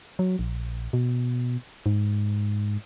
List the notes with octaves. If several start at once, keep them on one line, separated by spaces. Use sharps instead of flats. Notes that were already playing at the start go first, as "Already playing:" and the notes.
F#3
A#1
B2
G#2